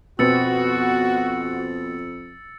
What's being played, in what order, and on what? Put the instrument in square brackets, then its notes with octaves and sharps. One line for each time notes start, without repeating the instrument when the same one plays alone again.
[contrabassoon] F2 [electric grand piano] B2 B3 C4 [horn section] F#4 [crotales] E6 A6 C#7